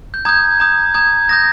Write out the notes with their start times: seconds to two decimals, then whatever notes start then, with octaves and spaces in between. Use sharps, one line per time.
0.14 G6
0.25 A#5 D#6 G6 G#6
0.60 A#5 D#6 G6
0.94 A#5 D#6 G6 G#6
1.29 A#5 D#6 G6 A#6